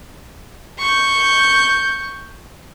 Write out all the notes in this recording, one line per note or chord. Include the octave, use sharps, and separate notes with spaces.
C#6 G6